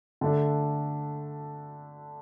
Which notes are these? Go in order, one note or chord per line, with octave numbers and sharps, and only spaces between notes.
D3 A3 D4